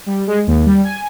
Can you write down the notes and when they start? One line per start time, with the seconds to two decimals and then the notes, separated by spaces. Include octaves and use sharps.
0.06 G3
0.27 G#3
0.47 D#2
0.66 G3
0.84 G#5